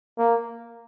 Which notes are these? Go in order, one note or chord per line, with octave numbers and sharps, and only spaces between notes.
A#3